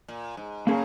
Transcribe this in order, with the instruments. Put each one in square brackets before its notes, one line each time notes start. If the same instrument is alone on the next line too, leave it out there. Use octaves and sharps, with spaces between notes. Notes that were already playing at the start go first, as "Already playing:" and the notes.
[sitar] A#2
G#2
[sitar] C#3 [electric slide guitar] A#3 C#4 G#4